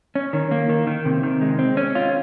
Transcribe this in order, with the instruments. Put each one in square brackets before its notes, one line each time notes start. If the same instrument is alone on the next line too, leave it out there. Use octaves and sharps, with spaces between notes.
[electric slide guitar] C#4
D#3
A#3
D#3
D#3
C3
D#3
G#3
C4
C#4
F4